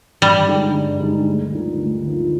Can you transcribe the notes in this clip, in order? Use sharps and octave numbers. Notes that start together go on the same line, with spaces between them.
G2 G3
D3 G#3 D#4 G4
G2
D3 G#3 D#4 G4
D2
D3 F3 A#3 D#4
D2
D3 F3 A#3 D#4